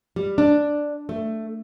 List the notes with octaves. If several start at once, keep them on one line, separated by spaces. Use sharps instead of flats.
G3
D4
A3